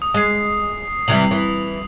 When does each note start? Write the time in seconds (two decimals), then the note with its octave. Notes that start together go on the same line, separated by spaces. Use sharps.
0.02 D#6
0.14 G#3 D#6 C7
1.08 C3 E3 G3 F7 F#7
1.31 E3